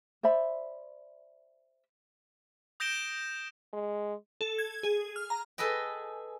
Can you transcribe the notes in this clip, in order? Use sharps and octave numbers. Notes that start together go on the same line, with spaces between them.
C5 D5 E5 B5
D#6 G6 A#6 D7 E7 G7
G#3
A4
G#6
G#4
F6
A#5
G#4 A4 B4 D#5 G5